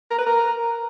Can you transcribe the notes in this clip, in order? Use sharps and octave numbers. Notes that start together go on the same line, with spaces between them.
A#4
B4
A#4